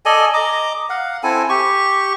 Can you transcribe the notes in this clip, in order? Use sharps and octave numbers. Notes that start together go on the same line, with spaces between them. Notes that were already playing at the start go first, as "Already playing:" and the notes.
A4 D5 D#5 G#5
D#5 A#5 D6
F5 F#5
C4 E4 A4 G#5
G4 C#6